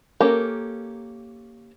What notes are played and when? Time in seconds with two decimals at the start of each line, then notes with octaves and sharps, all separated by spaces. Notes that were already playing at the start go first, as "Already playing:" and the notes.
0.21 A#3 C#4 G4 A4 A#4